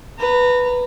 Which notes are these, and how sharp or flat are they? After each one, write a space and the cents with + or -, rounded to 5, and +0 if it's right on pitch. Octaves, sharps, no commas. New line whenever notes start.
B4 +0 A#5 -25